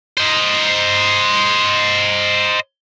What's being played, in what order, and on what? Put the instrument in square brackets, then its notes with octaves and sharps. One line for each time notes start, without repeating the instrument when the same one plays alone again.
[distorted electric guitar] C5 D#5